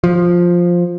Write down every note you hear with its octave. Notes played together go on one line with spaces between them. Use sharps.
F3